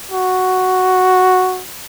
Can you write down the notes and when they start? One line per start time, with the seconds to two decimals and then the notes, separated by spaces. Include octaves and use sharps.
0.11 F#4